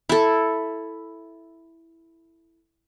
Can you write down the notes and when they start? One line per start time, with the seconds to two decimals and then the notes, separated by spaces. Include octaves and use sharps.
0.09 E4 A4